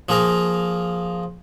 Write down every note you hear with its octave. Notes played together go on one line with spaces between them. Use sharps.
F3 A#3 G#4 A#4